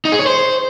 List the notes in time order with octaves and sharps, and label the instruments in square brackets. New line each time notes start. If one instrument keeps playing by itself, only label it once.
[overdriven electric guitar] D#4
G#4
C#5
C5